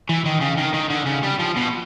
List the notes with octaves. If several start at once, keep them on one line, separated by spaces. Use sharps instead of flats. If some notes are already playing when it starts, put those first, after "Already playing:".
E3
D#3
C#3
D#3
D#3
D3
C#3
G3
F3
B2